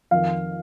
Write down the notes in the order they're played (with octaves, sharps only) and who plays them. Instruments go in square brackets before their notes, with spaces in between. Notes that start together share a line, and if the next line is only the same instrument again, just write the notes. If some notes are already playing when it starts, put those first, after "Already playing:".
[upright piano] F2 D#3 F5